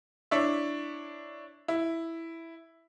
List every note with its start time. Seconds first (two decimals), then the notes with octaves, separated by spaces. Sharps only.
0.31 D4 E4 C#5 E5
1.68 E4